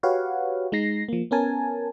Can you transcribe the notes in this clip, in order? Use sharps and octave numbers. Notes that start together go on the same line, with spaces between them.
F#4 G4 B4 C#5 F5 F#5
G#3 D#4 A#6 C7
F3 A#3
B3 C#4 A#4 G#5 A5